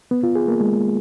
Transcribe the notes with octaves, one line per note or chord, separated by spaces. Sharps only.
B3
F4
G#4
A#3
G#3